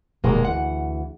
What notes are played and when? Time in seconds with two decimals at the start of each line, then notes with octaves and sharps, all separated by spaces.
0.24 E1 A#2 D#3 G3 G#3 A#3
0.45 D2 E3 F#5